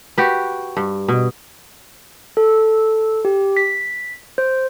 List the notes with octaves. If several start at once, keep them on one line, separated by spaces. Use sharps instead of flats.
F#4 G4 B4
G2
B2
A4
G4
B6
C5